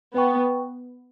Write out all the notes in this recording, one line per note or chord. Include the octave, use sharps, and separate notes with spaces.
B3 B4 G5 C#6